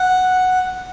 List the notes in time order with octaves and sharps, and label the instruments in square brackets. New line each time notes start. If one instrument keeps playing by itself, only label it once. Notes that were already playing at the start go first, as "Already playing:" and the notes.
Already playing: [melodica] F#5